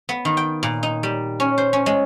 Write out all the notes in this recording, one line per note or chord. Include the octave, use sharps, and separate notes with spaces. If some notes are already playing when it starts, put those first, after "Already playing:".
B3
D#3
G5
A#2
D#4
G3
C#4
C5
C#4
G#3